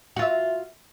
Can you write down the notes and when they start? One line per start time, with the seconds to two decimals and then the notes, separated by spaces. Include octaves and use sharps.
0.16 F#4
0.19 F4
0.22 E5